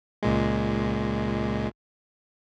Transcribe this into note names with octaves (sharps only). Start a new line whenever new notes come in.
C#2 A#2 G#3